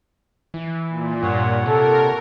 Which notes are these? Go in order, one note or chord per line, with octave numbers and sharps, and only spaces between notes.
E3
A#2
G2 C#5 F#5
C3 A4 A#4